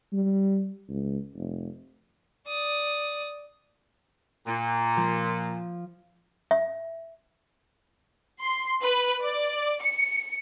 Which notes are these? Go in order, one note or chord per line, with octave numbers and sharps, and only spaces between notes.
G3
C#2
F1
D5 D#6
A#2
F3
E5
C6
B4
D5
C#7